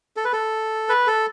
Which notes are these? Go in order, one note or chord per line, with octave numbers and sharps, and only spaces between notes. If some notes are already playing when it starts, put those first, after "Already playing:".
A4
B4
A4
B4
A4